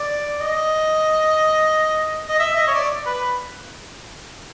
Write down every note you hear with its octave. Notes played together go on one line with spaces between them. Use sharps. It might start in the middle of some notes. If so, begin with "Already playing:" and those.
Already playing: D5
D#5
D#5
E5
D#5
C#5
D5
B4